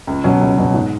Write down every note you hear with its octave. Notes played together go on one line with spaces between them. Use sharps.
C#2
B2 F#3 C#4
C#2
B2 F#3 C#4
G#2